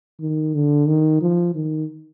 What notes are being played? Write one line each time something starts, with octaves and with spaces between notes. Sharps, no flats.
D#3
D3
D#3
F3
D#3